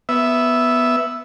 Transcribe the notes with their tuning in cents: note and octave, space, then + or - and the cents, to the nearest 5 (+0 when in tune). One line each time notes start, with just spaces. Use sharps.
B3 +0 E5 +0